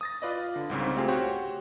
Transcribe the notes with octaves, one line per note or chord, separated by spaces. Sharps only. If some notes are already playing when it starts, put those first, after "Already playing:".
D#6 A6 A#6
F4 B4 D5 D#5
D3
C2 G#2 C#3 C4
A3 C4 F4 G4 G#4
F#4 G4 C5 C#5